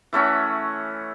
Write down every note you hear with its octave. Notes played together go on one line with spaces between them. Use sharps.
E3 A3 C#4 F#4